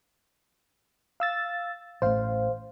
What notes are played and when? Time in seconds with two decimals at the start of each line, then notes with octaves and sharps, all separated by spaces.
1.20 F5 E6 A6
2.02 A1 A2 C5 F5